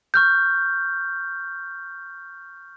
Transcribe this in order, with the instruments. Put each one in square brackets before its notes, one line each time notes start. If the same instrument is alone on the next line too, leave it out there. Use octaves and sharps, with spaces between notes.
[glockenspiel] C#6 F6 G6